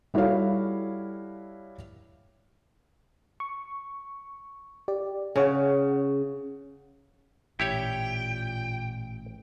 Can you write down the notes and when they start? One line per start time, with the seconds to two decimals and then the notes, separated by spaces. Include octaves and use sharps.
0.14 G3 E4 F#4 A4 C#5 F5
3.40 C#6
4.88 G4 D5
5.36 C#3 G#4 C#5 F#5
7.60 A1 A#2 E4 G4 C#5 G5